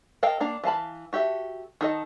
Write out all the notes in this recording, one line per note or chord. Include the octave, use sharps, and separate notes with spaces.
A4 A#4 D#5 F5 G5
A#3 D4 A#5
E3 F5 A5 B5
F#4 G4 A4 E5
D#3 A4 D#5